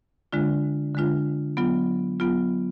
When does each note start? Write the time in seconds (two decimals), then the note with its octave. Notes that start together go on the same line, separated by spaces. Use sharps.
0.33 D3 G#3 D4 F4
0.95 D3 G#3 D4 F4
1.57 F#3 B3 F4
2.20 F#3 B3 F4